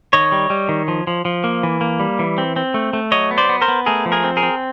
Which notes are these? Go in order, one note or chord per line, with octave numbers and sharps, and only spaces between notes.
D#3 C#5 D#5
G3
G3
D#3
F3
F3
F3
A#3
E3
A#3
G3
E3
C4
C4
A3
A3
F#3 C#5 D#5
B3
C5 D5
B3
A#4 C5
B3
A3 G#4 A#4
F3
G#4 A#4
C4
G#4 A#4
C4